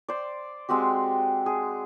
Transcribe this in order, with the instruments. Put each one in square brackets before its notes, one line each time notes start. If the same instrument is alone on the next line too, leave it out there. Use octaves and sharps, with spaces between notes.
[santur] C5 D5
G#3 C4 F#4 G4
G#4